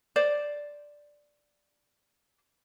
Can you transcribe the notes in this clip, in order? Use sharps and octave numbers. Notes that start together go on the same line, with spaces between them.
C5 D5